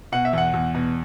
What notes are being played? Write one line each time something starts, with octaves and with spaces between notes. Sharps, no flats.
B2 F#5
E5
E2 F#5
E2
B2